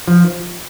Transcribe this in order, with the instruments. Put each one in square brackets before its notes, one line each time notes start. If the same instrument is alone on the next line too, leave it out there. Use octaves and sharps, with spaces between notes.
[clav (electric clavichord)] F3